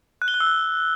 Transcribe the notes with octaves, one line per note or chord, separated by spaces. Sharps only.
F#6
G7
F#6
E6
F#6